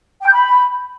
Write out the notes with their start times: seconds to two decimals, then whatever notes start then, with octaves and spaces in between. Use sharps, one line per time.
0.21 G5
0.26 G6
0.32 B5